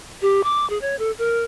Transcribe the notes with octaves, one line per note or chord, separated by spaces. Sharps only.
G4
D6
G#4
C#5
A4
A#4